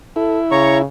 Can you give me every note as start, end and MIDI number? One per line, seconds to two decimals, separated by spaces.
0.16 0.82 64
0.16 0.38 69
0.51 0.84 49
0.51 0.78 73
0.51 0.78 82
0.51 0.78 85